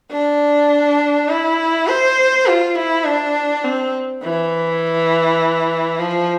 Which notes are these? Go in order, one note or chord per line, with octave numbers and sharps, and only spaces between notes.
D4
E4
C5
F4
E4
D4
C4
E3
F3